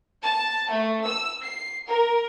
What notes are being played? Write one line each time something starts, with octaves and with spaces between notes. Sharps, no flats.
A5
A3
E6
C7
A#4